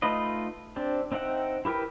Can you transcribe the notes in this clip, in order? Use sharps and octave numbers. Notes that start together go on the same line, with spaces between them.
A3 D#4 F4 B4 D#5
C4 D4 G4
C4 D#4 E5 F#5 G5
E4 G4 A#4 B4 G5